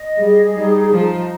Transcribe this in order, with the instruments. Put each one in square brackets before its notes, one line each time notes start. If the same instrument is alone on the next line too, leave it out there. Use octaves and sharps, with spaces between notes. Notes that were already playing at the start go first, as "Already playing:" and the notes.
Already playing: [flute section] D#5
[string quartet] G3 [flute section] G#4
[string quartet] G3 [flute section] D#4
[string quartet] F3 [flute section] D#4